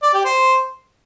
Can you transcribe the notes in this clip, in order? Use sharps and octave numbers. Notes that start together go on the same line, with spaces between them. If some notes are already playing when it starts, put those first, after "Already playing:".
D5
G4
C5